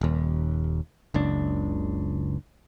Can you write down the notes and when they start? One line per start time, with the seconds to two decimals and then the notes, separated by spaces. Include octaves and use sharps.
0.01 D#1 D#2
1.14 F#1 C#2 D4